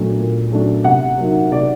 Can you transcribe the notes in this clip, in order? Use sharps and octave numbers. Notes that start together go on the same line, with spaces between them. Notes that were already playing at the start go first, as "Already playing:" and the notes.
Already playing: A#2 F#3 A3 D4
A#2
F#3 A3 D4
C3 F#5
F#3 A#3 D#4
C3 D5